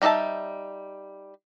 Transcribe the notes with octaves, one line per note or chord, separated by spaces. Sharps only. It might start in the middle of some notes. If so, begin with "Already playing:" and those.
G3 D#4 D#5 E5 A5